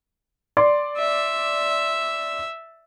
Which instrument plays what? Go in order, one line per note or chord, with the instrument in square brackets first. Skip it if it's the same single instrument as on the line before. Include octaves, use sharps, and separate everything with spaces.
[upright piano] D5 C6
[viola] E5